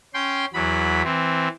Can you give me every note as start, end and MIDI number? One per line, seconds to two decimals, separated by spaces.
0.14 0.46 61
0.14 0.46 79
0.14 0.46 84
0.54 1.02 40
0.54 1.02 54
0.54 1.02 83
1.04 1.48 52
1.04 1.48 60